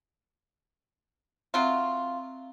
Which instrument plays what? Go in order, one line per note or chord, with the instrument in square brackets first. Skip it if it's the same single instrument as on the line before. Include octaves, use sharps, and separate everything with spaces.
[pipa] F#3 F4 [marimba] C4 E5